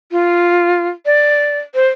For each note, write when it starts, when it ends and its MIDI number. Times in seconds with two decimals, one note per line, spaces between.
0.12 0.89 65
1.06 1.59 74
1.75 1.87 72